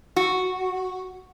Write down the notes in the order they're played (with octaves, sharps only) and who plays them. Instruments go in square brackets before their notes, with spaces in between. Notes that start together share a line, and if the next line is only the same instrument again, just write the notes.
[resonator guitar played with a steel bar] F#4